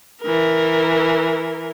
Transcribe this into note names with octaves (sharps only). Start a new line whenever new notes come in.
E3 A#4